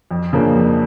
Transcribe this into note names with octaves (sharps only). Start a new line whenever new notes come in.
F2
C#3 F3 A#3 D4
F2